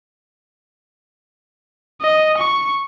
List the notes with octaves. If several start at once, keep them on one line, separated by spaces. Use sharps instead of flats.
D#5
C#6